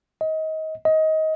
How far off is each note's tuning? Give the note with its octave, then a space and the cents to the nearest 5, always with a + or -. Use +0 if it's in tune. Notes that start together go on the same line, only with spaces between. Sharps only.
D#5 +25
D#5 +20